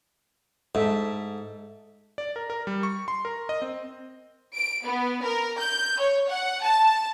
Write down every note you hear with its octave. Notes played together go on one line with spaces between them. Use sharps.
G#2 A4 E5
D5
A#4
A#4
G3
C#6
C6
A#4
D#5
C4
D7
B3
A#4
G6
C#5
F#5
A5